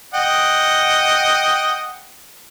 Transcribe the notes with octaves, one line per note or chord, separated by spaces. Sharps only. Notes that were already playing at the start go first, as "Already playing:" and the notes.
D#5 F#5 G5